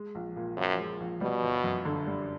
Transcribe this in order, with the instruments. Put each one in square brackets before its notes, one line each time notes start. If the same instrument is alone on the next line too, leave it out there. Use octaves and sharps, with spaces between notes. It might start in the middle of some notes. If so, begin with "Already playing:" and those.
Already playing: [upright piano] G#3
A#1
A#2
[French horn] F#2 [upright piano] F3
[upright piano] G#3
A#1
[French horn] B2 [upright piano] G3
[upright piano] G1
F#2
D3
G3